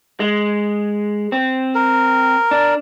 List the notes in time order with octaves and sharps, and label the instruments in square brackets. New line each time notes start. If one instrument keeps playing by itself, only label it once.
[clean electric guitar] G#3
C4
[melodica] A#4
[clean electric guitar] D4